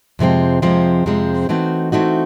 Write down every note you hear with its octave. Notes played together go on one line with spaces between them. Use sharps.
F2 C3 F3 G#3 C4
F2 C3 F3 G#3 C4
F2 C3 F3 G#3 C4
E3 A3 C4 D#4 F#4
E3 A3 C4 D#4 F#4